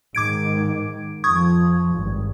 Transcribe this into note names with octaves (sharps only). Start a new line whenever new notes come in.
G#2 D#3 D6 G#6 D7
F2 F3 C#6 D#6 G#6
G#1 G2